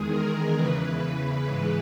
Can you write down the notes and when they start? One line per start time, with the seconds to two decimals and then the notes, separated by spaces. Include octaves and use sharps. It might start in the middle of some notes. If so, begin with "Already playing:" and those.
Already playing: E2 D#3 G#3 G#4
0.10 A#4
0.56 E2 C#3 E3 B4
1.47 G#2 E3 G#3